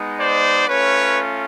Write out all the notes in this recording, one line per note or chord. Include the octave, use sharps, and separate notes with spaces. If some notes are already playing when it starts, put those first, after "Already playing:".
Already playing: G#3 B3 D#4
C5 D5
A3 C#4 F4 B4 C#5